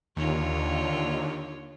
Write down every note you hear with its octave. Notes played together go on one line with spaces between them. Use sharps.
D#2 D3 F4 C#5